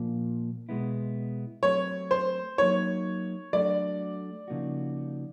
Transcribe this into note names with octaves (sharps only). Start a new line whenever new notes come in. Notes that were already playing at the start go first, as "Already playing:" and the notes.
Already playing: A#2 F3 A#3
B2 G#3 B3 E4
F#3 A3 C4 C#5
C5
F#3 A#3 D#4 C#5
F#3 A3 D4 F#4 D5
C#3 F3 A#3 D#4 F#4